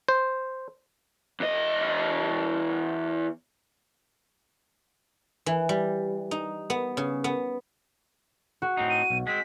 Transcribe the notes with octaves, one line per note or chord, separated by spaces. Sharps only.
C5
E2 D#5
E3
G3
D#4
B3
C#3
B3
F#4
A2 C4 D#4
D#7
B1
G#3 C4 B6